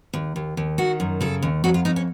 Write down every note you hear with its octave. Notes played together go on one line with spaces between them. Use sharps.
D#2
D#2
D#2
D#3 F#4
F#2
C#3 A4
D#2
F2 F#4
F4
F2 D#4
C#4